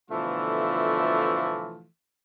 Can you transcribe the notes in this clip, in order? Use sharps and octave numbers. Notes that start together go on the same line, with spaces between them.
B2 D3 E3 F3 A3 F4